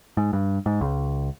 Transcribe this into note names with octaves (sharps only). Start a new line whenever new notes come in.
G#2
G2
G#2
C#2